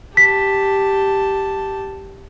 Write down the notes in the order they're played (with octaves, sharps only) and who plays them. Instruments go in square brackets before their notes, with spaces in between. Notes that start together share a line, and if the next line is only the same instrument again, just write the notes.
[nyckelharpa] G4 A5 [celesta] B6